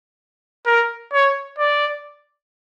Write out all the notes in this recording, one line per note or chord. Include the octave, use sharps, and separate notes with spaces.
A#4
C#5
D5